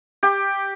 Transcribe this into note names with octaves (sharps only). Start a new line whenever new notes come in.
G4